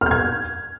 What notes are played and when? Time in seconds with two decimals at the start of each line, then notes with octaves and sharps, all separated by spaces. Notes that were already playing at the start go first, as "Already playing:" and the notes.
0.01 F6
0.06 G6
0.11 G#6